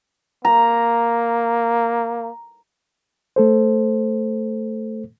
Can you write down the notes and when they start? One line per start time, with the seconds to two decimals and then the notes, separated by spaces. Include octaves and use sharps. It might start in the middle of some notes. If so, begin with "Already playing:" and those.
0.45 A#3 A#5
3.36 A3 A4 C5